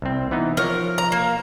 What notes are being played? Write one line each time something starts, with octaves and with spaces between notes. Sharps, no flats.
C2 C4
E3 B3 D#4
F3 A#4 C#5
A#5
A#3